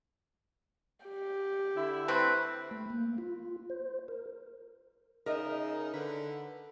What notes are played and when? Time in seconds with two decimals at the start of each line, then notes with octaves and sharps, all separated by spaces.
1.05 G4
1.76 D3 E4
2.08 G3 A3 C4 B4
2.71 A3
2.90 A#3
3.18 F4
3.70 C5
4.08 A#4
5.26 C#3 D#4 A#4 D#5 E5
5.94 D3 B4